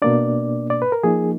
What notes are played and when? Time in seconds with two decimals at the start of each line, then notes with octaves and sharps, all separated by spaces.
0.02 B2 A#3 D4 D5
0.70 D5
0.82 B4
0.92 A#4
1.03 F3 A#3 D#4 G#4